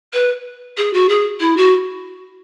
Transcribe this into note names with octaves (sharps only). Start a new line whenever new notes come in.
B4
G#4
F#4
G#4
E4
F#4